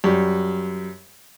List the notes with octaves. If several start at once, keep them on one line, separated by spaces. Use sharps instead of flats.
F#2 G3